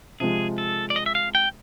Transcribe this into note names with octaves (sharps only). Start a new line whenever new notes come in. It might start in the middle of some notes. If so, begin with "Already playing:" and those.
C3 F3 G#3 G#4
A4
D5
D#5
E5
F5
G5